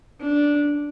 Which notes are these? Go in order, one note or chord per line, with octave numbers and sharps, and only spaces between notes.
D4